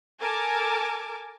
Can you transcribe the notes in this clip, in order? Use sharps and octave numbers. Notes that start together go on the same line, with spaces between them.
A4 A#4 G#5 A5 D6